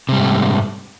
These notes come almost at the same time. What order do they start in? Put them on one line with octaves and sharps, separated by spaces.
C3 G3 G#2 A3